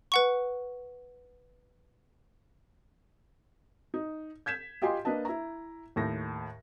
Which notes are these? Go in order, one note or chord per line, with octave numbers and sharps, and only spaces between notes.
B4 F#5 C#6
D#4
G6 G#6 B6 E7
F4 G4 D#5 F5 G#5 C6
A#3 D4 B4 D#5 A5
E4 A#5
D#2 A2 A#6